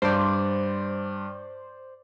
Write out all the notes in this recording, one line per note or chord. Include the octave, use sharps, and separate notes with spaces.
G2 C5 D5